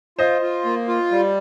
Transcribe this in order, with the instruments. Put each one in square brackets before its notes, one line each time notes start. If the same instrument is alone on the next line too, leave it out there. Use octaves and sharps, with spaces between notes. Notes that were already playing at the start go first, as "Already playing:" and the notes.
[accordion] F4 [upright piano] C5 D#5
[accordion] F4
A#3
F4
G3